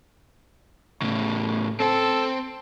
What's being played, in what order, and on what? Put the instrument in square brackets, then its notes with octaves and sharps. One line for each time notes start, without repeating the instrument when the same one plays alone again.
[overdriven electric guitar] A2 C#3
[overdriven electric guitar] C4 C5 [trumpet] A4